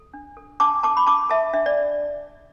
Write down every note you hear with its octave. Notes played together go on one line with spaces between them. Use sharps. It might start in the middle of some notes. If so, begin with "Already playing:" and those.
Already playing: A4
D4
A4
D4 A5 D6
A4 A5 D6
B5
D4 A5 D6
A4 E5 A5
D4 E5
D5